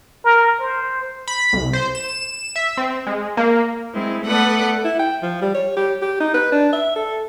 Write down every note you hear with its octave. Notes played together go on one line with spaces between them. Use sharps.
A#4
C5
B5
C2
C5
E7
E5
C4
G#3
A#3
G#3 C4 E4
A3 B3 A4 B4 D5 F#5
E4
G5
F3
G3
C#5
G4
G4
D#4
B4
D4
E5
A4